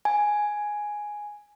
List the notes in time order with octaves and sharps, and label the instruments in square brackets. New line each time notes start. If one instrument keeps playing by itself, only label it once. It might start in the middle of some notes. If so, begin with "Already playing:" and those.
[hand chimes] G#5